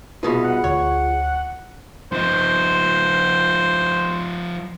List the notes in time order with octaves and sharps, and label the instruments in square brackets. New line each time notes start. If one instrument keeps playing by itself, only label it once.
[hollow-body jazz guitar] C2 B2 D#4 [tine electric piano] F4 G#4 [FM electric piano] B4 B5
[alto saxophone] F#5
[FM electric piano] D2 [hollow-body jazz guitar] C#5
[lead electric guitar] F3 D#4 [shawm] C5